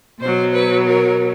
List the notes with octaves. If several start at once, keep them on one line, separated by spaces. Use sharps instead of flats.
B2 F#3 C5
B4
A#4